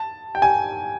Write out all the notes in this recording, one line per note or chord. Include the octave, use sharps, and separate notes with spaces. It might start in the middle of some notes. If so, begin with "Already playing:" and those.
Already playing: A5
G5
G#5